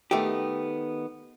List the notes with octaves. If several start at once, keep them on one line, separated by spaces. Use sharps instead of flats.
D#3 A3 B3 G4